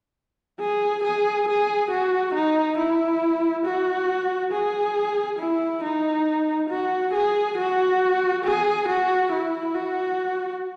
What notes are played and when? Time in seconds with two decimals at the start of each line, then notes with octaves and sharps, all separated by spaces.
0.60 G#4
1.04 G#4
1.48 G#4
1.91 F#4
2.34 D#4
2.78 E4
3.65 F#4
4.52 G#4
5.39 E4
5.83 D#4
6.70 F#4
7.14 G#4
7.58 F#4
8.44 G#4
8.88 F#4
9.32 E4
9.74 F#4